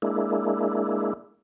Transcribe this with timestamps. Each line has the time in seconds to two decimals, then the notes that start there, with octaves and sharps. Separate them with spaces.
0.02 G#3 A#3 D4 E4